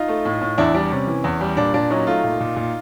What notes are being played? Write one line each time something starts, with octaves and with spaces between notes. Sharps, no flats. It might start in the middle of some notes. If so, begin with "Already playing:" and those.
Already playing: D#4 F4
A3
A2
A2
E2 D4 E4
G3 D4
C3 C#4
E3
E2
G3
A#2 D4
A#2 D4
F#3 C#4 D#4
A3 D#4 F4
A#2
A#2
A#2